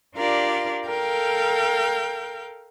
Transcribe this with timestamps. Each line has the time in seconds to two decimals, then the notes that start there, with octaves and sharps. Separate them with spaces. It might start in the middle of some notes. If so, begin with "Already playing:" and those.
0.16 D4 F4 G4 A#4 D5
0.88 A4 A#4 F5 G5 G6